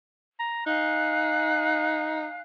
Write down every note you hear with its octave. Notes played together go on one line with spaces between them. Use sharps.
A#5
D#4 F5 G#5 F#6